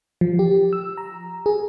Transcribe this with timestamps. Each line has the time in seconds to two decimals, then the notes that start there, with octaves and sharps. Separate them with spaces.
0.21 F3
0.39 G4
0.73 E6
0.97 A#5
1.46 G#4